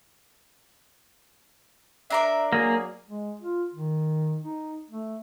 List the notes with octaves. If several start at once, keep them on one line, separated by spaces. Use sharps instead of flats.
D4 A#4 D5 E5
F#3 A#3 G#4
G#3
F4
D#3
D#4
A3